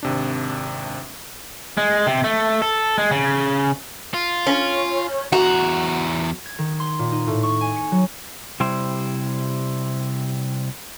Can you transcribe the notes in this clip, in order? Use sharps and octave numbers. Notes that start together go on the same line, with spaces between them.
G#1 C3 D4
G#3
C3
A3
A4
G#3
C#3
F4
C#4
E2 F#4 A#5
G#6
D#3
C6
A#2
D#4
A2
C#6
G#5
C#7
F#3
C3 G3 E4 C5